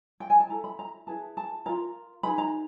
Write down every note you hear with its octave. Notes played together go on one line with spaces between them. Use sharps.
G5
G#5
A5
E4 A4 A#5
B5
A#5
E4 G#4 B4 A5
A5
F4 A#4 A#5
D#4 G#4 B4 B5
A#5